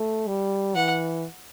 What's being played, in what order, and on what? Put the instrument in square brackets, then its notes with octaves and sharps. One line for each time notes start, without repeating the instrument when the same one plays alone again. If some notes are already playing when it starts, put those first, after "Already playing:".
Already playing: [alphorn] A3
G3
[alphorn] E3 [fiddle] F#5